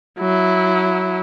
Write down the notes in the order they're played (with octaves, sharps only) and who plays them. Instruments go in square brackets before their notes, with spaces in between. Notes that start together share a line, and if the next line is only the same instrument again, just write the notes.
[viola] F#3 E4